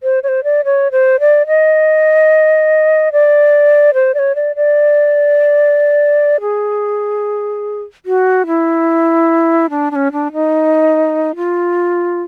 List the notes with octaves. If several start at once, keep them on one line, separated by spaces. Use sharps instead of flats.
C5
C#5
C5
D5
C#5
C5
D5
D#5
D5
C5
D5
C#5
D5
D5
G#4
F#4
E4
D4
D4
C#4
D4
D#4
F4